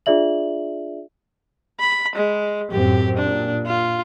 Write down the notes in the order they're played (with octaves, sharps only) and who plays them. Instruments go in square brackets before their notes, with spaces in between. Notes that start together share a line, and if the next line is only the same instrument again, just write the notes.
[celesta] D4 F4 G#4 D5 E5 F#7
[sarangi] B5
G#3
[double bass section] F#2 A2 C4 [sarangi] G4
[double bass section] A#2 [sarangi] D4
[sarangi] F4